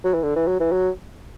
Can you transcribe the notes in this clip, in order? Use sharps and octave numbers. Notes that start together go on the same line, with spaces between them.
F#3
E3
D3
E3
F#3
E3
F#3